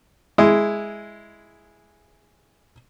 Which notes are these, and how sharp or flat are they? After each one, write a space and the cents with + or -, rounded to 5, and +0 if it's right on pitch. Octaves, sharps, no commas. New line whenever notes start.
G#3 +0 E4 +0